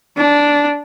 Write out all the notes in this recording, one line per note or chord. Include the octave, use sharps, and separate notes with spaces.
D4